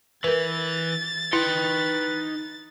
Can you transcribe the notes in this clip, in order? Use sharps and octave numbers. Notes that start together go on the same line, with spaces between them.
E3 A#4 B4 A6
D#4 E4 B4 G5